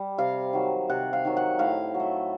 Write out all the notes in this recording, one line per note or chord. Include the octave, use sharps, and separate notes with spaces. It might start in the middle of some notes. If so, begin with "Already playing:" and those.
Already playing: G3
C3 F5
D#3 F#3
C3 F#5
F5
D#3 F#3
F#5
A2 F5
F#3
A3